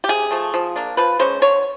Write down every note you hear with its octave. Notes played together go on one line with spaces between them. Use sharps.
G4
C3 G#4
F3 A3
F3
A#3 D4
F3 B4
G#3 C#4 C5
D3 C#5